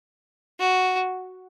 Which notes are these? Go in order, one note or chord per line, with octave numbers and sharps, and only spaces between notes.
F#4